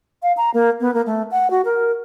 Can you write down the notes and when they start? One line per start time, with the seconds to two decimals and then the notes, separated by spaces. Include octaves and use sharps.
0.23 F5
0.37 A#5
0.54 A#3
0.80 B3
0.94 A#3
1.06 A3
1.31 F#5
1.50 F#4
1.65 A#4